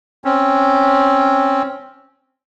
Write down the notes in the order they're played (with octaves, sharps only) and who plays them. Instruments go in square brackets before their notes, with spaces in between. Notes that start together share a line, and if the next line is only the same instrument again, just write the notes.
[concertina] C4 C#4